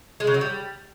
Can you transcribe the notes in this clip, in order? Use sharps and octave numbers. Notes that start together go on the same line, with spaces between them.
G#3
C#3
F#3
G3